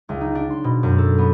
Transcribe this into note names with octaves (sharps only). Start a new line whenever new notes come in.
C#2
D#4
D4
C6
B2
F#2
A4
B3